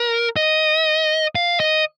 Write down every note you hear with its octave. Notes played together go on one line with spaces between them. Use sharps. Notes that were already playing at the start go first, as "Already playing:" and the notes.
Already playing: A#4
D#5
F5
D#5